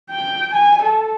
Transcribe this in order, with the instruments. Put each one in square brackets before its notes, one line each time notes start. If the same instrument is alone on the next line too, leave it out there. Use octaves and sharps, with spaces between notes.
[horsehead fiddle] G5
G#5
A4